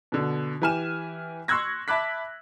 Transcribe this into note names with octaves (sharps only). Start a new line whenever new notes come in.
B2 D3
E3 G4 G#5 F6 E7
C6 C#6 E6 F#6 G#6 A#6
E5 A5 B5 D6 F#6 B6